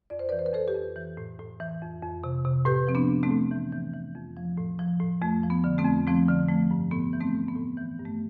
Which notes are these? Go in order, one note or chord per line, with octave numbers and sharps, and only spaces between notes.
F2 D5
C5
E3 B4 D5
C5
B4
F2 A4 C5
G4 B4
F2
E3
A2
A2
E3
F2
F2
C3
C3
A2 G4 B4
F3 C4
B3 D4
A2
A3 C4
A2
E3
E3
E3
F2
F3
A2
F3
A2
F2 A3
F3
B3
D3
A3 C4
F2
F3 A3 C4
D3
F3 A3
G2
A2 B3
E3
A3 C4
A2
B3
A2
E3
G2
A3